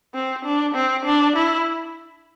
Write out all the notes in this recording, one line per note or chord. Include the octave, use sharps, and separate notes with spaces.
C4
D4
C4
D4
E4